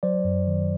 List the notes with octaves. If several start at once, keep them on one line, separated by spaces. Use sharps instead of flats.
F#3 C5 D5
F#2
D#3